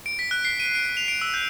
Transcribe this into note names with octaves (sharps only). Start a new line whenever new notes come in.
D7
B6
F#6
C7
D#7
D7
F7
D7
E6
G6